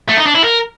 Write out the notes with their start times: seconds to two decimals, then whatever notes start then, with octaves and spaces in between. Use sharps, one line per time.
0.09 A3
0.18 D#4
0.26 D4
0.35 E4
0.44 A#4